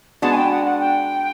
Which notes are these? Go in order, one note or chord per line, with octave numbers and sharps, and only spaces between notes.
G#3 B3 D4 F#4 A5
G#5
G5
F#5
F#5
G5